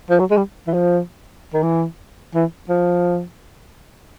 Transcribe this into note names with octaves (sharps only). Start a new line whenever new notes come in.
F3
F#3
G#3
G3
E3
F3
D#3
E3
E3
F3